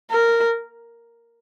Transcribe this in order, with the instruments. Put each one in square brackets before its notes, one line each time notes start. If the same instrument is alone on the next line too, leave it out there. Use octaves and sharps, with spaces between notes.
[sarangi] A#4